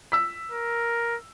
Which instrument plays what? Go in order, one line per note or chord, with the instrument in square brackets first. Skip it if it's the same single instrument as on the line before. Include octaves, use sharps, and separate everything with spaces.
[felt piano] E6 B6
[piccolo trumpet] A#4